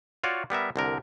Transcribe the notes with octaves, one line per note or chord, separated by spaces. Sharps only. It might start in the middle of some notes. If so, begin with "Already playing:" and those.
F4 F#4 C#5 D5
G3 B3 A#4 E5
C2 D3 A#4